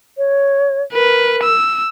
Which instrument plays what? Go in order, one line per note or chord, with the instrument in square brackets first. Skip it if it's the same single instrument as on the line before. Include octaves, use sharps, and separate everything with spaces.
[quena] C#5
[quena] A#4 [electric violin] B4
[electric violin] E6